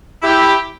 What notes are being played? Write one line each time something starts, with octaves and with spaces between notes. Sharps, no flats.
E4 G4